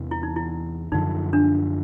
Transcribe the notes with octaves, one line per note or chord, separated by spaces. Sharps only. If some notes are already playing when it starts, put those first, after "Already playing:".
Already playing: E2 C3 E3
E4
D#4
E4
F#2 D3 F3 D#4
D4